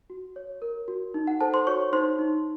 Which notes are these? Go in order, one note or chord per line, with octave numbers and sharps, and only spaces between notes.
F#4
C#5
A#4
F#4
D#4
F#5
A4 C5 A5
C5 C6
F#4 C#5 C#6
D#4 C5 C6
D#4